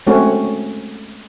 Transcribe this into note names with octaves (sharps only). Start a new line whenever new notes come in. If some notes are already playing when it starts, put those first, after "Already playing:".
G#3 A3 C4 C#4 F#4